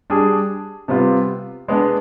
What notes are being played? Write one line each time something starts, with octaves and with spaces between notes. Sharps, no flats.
G3 D4 G#4
C3 G3 B3 F4
G#3 B3 D4